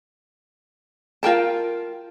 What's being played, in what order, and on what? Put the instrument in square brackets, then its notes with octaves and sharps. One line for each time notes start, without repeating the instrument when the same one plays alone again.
[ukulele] F4 A#4 G5 A5